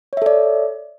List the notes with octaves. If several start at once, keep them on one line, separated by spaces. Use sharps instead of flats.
A4 C#5 D5 E5